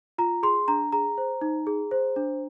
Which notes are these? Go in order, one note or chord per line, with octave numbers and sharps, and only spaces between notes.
F4 A#5
G#4 C6
D4 A#5
G#4 A#5
C5
D#4
G#4
C5
D4